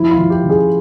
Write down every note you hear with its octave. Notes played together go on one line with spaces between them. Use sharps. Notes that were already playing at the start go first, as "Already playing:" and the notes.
Already playing: F3 E4
F4
F3
G4
C#3
G#4